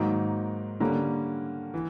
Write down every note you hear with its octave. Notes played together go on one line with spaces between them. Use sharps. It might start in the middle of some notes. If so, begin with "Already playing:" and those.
Already playing: G#2 D#3 F#3 A#3 D#4
D3 G3 A#3 C#4
E3